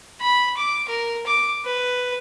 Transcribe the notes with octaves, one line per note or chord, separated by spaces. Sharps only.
B5
D6
A#4
D6
B4